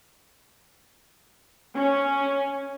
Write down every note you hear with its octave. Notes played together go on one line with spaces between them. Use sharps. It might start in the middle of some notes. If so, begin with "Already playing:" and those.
C#4